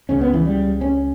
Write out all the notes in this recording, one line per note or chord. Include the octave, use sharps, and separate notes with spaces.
C#2 C#3 C#4
B3
E3
G3
C#4